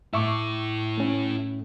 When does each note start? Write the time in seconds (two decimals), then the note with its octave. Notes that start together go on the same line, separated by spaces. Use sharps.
0.14 A2 E4 A4 E5 C#6 D6
0.98 A3 C#4